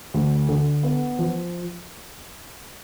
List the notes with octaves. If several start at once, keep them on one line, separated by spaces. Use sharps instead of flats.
D2
D3
B3
F3